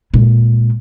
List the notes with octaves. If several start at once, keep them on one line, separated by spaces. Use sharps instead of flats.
A#2 G#3